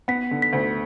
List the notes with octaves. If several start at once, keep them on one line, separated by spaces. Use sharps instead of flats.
B3 B6
D3
B6
D2